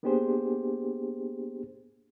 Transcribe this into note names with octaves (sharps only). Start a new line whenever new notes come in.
A#3 B3 D4 G4 G#4 C5